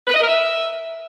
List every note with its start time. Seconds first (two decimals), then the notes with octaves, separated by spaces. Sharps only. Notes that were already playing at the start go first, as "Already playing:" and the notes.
0.07 B4
0.14 D#5
0.21 A#4
0.27 E5